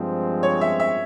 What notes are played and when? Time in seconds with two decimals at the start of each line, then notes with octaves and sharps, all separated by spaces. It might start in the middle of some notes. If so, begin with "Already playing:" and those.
Already playing: G2 F3 G#3 C4
0.43 C#5
0.61 E5
0.80 E5